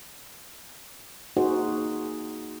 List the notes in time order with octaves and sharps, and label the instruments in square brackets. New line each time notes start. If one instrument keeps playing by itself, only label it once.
[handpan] A#3 D#4 F#4 G#4 C5